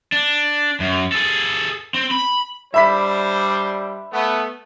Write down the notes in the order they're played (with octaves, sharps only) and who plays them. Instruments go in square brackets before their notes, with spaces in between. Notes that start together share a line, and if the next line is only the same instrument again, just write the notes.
[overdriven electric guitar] D4
F#2
G#4 A4
C4
B5
[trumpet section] G3 D4 C5 [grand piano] E5 B5 B6
[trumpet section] A3 B3